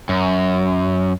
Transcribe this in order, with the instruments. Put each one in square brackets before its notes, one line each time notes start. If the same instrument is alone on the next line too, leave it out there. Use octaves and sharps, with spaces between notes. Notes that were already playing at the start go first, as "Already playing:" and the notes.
[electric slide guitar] F#2